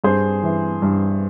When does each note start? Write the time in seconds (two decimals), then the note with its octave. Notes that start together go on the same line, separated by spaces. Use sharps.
0.04 G2 G#4 C5
0.43 E3
0.82 G2